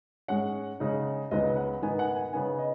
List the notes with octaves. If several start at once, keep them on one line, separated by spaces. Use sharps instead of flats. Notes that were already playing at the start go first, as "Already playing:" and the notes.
G#2 G#3 C#4 F#5
C#3 G#3 D#4
C#2 C#3 B3 D#4 D#5
F#5
G#2 D#3 B3 D#4 G#5
F#5
G#5
C#3 B3 D#4 G#5
D#5